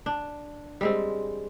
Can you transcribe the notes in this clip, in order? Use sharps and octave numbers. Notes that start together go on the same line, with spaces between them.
D4
G3 G#3 C4